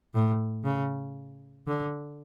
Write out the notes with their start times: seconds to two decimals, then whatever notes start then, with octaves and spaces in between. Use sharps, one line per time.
0.14 A2
0.64 C#3
1.67 D3